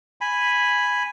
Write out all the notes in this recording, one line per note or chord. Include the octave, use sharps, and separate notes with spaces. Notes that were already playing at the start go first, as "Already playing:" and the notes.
G#5 B5